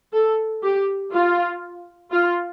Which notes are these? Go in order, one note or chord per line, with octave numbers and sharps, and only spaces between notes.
A4
G4
F4
F4